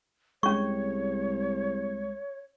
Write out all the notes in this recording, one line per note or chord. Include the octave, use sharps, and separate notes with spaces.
C2 G#3 C#4 C#5 C#6